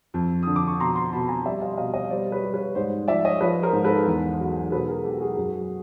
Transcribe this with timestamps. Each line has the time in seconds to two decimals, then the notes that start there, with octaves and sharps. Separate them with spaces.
0.14 F2
0.43 D3 D#6
0.56 D6
0.67 C#6
0.79 B2 A#5 C6
0.96 A#5 C6
1.13 B2 A5 B5
1.23 B5
1.28 G#5 A#5
1.45 G3 D5 E5
1.62 D#5 F5
1.77 B2 D#5 F5
1.93 C#5 D#5
2.10 G3 C5 D5
2.32 B4 C#5
2.43 G3
2.54 B4 C#5
2.75 G#2 C5 D5
3.08 F3 D5 E5
3.25 C#5 D#5
3.41 F3 B4 C#5
3.62 A#4 C5
3.73 G#2
3.84 A4 B4
4.07 E2
4.39 F#3
4.71 B2 A4 B4
4.88 G#4 A#4
5.04 F#3 G4 A4
5.20 F#4 G#4
5.37 F#2